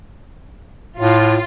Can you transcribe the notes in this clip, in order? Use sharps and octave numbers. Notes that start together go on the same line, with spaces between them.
A2 F4